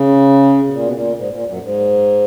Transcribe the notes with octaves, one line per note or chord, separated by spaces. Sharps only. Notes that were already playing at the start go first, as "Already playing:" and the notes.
Already playing: C#3
B2
A#2
B2
A#2
G#2
A#2
F#2
G#2